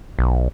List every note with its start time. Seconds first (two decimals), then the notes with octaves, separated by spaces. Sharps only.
0.19 B1